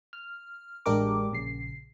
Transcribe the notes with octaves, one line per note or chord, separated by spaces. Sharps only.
F6
A1 G#3 D4 G4 A#4 D6
A#1 C#3 C7